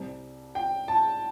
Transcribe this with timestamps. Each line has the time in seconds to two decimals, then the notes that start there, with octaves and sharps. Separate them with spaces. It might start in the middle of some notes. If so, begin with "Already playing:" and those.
Already playing: C2 C3 G3 C4
0.55 G5
0.88 A5